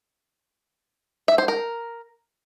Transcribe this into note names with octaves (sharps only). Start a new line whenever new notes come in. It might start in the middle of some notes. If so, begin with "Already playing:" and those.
E5
C5
A#4